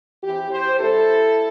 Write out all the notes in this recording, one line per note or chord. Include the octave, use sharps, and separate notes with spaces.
E3 C4 G4
G4 C5
C3 G3 C4 E4 A4